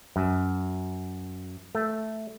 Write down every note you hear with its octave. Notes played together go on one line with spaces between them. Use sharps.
F#2
A3